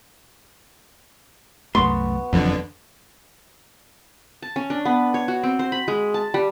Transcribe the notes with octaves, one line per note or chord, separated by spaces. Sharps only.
C2 F#2 A3 B3 F#4 C6
F#1 F2 D3 E3 F#3
A5
C#4
D4
B3
C#5
F#4
C4
C5
B5
G#3
A5
G3